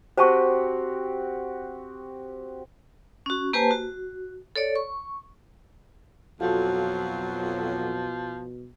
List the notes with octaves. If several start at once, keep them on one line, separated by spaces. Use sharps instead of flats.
C4 F#4 G4 C5 A5 C#6
C#4 F#4
A#3 G4 B4 C5 G#5 A5
F#4
A4 C#5 D5
C#6
F2 B2 F3 F#3 F4 F#4 A4